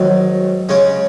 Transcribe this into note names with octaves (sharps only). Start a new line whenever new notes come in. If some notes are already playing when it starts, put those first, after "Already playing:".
Already playing: G#2 D#3 F#3
C#3 G#3 C#4